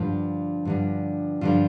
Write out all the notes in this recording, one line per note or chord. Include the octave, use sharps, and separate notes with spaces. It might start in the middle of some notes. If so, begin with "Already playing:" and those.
Already playing: G2 D3 F3 F4
G2 D3 F3
G2 D3 F3 F4